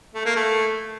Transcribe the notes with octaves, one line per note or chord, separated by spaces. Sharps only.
A3
A#3
A3